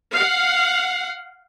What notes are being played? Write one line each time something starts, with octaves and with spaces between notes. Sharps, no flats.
F5 F#5